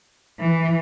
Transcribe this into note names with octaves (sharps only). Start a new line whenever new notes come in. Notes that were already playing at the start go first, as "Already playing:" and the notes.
E3